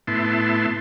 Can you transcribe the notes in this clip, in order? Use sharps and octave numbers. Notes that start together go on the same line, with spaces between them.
A2 B3 E4 A5 C6